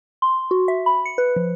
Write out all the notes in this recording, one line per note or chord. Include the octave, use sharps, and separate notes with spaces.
C6
F#4
E5
B5
C#7
B4
F3